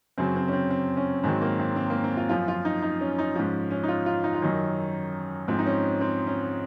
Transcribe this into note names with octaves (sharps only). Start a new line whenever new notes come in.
F#2 C#3 F#3 C4
C4
C#4
C4
C4
C#4
G#2 D#3 F#3 C4
A#3
C4
C4
A#3
C4
F4
F#2 F3 F4
F4
D#4
D#4
C#4
D#4
G#2 F3 C#4
C#4
D#4
F4
F4
D#4
F4
F#2 D#3 F#3 D#4
G#2 F3 C4
D#4
C#4
C4
C#4